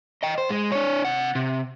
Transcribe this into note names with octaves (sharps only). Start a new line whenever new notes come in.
D#5 G5
C5
G#3
D4 C#5
C3 F#5
C3